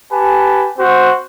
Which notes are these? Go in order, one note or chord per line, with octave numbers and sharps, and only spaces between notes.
G4 B4 G#5 A5
C4 F#4 C5